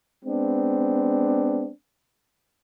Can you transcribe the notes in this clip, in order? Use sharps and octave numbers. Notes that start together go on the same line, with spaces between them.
G#3 B3 C4 D4